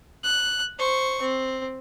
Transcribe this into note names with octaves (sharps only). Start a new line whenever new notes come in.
F#6
C5 C#6
C4